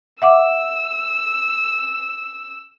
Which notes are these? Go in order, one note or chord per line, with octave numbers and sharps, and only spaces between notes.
E5 F#5 D6 E6